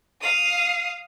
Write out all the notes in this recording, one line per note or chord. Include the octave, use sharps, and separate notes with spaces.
F5 D#6